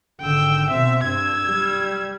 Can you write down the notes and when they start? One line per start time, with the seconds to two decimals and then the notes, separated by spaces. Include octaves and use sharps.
0.21 G#1 D3 G5 E6
0.71 B2 C4 E5
1.05 G2 E6 G#6
1.47 G3